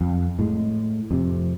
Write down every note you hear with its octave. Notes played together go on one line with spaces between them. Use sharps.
F2
A2 G#3
F2 C3